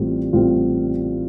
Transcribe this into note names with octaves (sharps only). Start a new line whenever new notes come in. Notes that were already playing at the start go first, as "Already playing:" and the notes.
Already playing: A1 A2 G3 C4 F4
A1 A2 G3 C4 F4